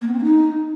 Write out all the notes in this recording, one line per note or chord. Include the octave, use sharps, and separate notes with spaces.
A#3
B3
C4
A#3
D#4